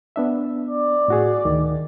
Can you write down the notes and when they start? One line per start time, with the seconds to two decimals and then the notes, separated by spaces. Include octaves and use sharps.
0.16 B3 D4 E5
0.67 D5
1.08 A2 F#4 G#4
1.45 D2 D#3